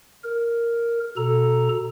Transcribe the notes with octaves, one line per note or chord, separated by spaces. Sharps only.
A#4
B2 A4 A#5